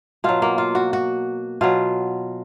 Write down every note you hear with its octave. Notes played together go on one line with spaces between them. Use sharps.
B2 F#3 F4
A#3
F4
F#4
F#4
B2 F#3 F4